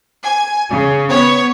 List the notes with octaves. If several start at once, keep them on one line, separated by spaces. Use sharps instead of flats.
G#5
C#3
B3 C#5